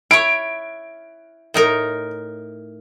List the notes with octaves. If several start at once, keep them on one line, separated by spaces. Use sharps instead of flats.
E4 C#5 D7
A2 D#4 A#4